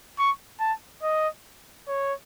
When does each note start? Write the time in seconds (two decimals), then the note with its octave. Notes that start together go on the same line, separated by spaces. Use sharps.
0.19 C#6
0.60 A5
1.03 D#5
1.88 C#5